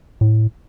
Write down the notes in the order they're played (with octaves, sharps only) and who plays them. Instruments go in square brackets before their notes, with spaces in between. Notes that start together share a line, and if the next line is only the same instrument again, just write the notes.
[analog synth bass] A2